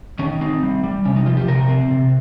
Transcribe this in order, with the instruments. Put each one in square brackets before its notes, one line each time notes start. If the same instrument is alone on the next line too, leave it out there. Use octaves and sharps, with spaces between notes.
[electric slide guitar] D#3 C#4
C4 D#4
G3
G3
C3 C#4
D#4
F3 F4
G4
C3 A#4
C4
C3